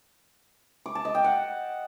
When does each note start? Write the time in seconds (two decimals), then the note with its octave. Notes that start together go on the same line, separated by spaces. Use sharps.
0.86 D6
0.95 A5
1.05 D#5
1.15 G5
1.24 F#5